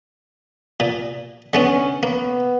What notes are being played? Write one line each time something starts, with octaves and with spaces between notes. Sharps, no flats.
A#2
D3 G#3 B3 C#4
A#3 B3